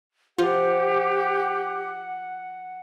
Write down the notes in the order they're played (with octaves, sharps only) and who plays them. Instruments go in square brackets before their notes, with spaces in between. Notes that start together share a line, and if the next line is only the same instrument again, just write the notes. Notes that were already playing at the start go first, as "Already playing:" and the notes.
[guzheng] F3 [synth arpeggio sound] F4 [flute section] G4 [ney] F#5